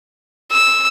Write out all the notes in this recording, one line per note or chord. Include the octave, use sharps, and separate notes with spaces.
E6